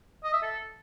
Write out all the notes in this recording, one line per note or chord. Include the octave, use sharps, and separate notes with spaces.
D#5
E5
A4